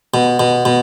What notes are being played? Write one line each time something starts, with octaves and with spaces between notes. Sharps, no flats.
B2
B2
B2